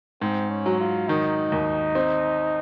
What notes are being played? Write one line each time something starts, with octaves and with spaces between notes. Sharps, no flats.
G#2 C4
C#4
F#3
F4
D#3 D#4
D#2
C4